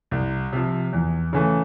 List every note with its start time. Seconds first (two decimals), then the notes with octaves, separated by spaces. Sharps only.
0.11 C2
0.53 C3 F3
0.93 E2
1.33 C#3 E3 A3